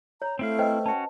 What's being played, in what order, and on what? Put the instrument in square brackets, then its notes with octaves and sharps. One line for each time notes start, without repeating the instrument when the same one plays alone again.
[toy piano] C#5 [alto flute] A#5
[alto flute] A3 [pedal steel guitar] C4 E4 F5
[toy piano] B4 C5 D#5 [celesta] G5
[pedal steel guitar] C#4 F#4 [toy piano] A5